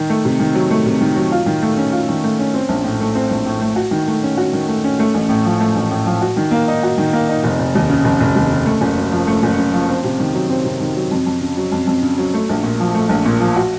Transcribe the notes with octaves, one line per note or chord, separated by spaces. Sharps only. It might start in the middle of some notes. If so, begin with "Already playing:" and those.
Already playing: D#3
A3
C3
D#3
F#3
A3
C3
D#3
F#3
F4
D#3
A3
C#4
F4
D#3
A3
C#4
C4
A#1
A2
A3
C4
A#1
A2
A3
F#4
D#3
A3
C#4
F#4
D#3
A3
C#4
A3
A1
A2
F3
A3
A1
A2
F3
F#4
D#3
A#3
D#4
F#4
D#3
A#3
D#4
F1
F1
D#2
C#3
F1
F1
D#2
C#3
A3
F#1
F#2
F3
A3
F#1
F#2
F3
C4
C3
D#3
F#3
C4
C3
D#3
F#3
F2
F2
C#3
F#3
F2
F2
C#3
F#3
A3
A#1
A#2
F3
A3
A#1
A#2
F3
F#4